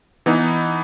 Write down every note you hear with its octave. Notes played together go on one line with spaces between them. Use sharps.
E3 B3 D#4